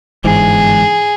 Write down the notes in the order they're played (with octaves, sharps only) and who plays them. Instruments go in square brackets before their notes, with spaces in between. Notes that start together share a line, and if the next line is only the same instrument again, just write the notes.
[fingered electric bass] G1 G#2 E3 [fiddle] G#4